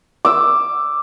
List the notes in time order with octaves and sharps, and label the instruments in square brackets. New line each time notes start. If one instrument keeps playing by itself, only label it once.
[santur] D6 E6